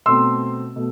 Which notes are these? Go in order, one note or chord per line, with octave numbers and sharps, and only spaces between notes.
B2 A3 C4 C6 E6
B2 A3